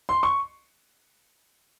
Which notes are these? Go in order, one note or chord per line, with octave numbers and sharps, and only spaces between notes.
C6
C#6